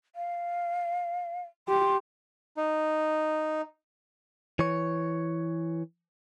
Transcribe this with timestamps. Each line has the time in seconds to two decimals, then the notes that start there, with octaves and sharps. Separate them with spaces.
0.16 F5
1.68 G4 C6
2.57 D#4
4.59 E3 C#5